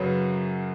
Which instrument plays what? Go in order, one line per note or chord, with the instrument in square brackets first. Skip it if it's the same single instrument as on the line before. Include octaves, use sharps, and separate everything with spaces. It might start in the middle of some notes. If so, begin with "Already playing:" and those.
Already playing: [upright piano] F#2 C#3 F#3 B4